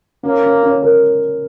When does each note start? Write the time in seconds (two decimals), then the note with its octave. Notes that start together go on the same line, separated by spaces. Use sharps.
0.23 A#3 C#4
0.43 C#4
0.63 C#4
0.82 A#4